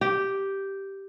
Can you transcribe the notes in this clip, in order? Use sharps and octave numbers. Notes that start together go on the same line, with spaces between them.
G4